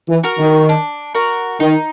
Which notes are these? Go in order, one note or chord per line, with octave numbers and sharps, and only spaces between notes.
E3
F#4 A#4
D#3
D4
F#4 A#4
D#3 D#4